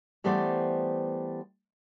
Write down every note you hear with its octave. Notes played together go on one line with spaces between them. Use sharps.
E3 G3 A3 B3 C5 D5